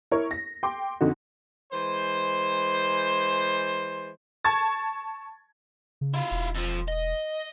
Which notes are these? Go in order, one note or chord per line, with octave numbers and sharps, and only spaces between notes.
E4 A#4 C#5 C#6
A#6
G5 C6 D6
F2 D3 D#4 F#4
E3 G#3 C5
A5 C#6 G#6 A6
C#3
E4 F4
E1
F2 F3
D#5